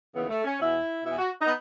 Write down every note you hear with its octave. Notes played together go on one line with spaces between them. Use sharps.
D#2 C#3 E3 B3
A3
C#4
E2 B2 E4
E2 B2 E4
F#4
D#4
B3